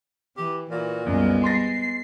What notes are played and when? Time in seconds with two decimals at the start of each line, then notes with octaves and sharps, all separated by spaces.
0.37 E3 G4
0.70 A#2 E3 F#4
1.06 C2 F#2 G#3 B3
1.44 C6 A6 A#6 C7